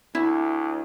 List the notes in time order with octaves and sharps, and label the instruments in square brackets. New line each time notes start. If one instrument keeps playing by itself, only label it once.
[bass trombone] D2 [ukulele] E4